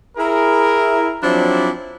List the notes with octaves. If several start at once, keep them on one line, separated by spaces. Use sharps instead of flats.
E4 G#4 A#4
F3 F#3 C4 D4 E4 D5